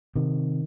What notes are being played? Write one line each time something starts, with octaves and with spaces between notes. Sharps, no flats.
C3 D#3